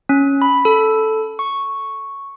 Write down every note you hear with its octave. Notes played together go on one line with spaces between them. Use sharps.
C#4
B5
A4
C#6